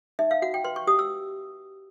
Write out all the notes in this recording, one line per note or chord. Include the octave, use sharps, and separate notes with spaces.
D#4 E5
F5
F#4 F#5
G5
B4 C6
C#6
G4 D#6
E6